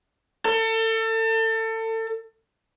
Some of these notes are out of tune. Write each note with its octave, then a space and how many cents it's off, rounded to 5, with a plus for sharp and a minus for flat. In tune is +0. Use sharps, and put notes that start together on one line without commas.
A4 +30